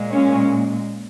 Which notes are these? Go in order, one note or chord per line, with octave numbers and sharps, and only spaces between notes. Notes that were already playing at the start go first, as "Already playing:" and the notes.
Already playing: A#2 G#3
C#4